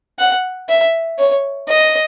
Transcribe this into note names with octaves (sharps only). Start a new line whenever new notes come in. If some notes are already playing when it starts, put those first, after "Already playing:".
F#5
E5
C#5
D#5